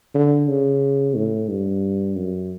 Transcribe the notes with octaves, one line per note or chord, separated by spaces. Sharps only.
D3
C#3
A2
G2
F#2